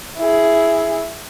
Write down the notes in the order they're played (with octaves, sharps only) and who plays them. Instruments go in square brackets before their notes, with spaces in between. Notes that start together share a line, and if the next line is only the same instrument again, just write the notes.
[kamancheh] E4 G#4